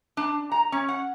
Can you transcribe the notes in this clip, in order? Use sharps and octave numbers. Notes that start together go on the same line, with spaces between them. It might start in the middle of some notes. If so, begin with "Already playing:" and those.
D4
A#5
C#4
F#5